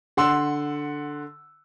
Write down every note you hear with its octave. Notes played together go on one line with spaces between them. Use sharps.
D3 F#5 C6 E6